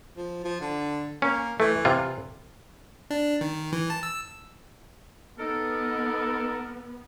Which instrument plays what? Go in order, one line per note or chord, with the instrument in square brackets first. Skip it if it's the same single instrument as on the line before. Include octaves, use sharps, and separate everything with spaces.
[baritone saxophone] F3
F3
D3
[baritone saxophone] A#3 [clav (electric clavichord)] C#4
[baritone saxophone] E3 [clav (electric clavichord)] A3
[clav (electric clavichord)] C3 F4
[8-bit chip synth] D4
D#3
E3
A5
E6
[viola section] B3 [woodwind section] D#4 A4 A#4